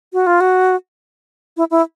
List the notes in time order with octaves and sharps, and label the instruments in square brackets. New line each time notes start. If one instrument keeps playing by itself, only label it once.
[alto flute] F#4
F4
F#4
E4
E4